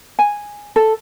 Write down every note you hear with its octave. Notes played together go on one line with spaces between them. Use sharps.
G#5
A4